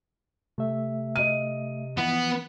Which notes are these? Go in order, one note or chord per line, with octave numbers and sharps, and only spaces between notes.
C3 A3 E5
D#5 D#7
E3 F3 B3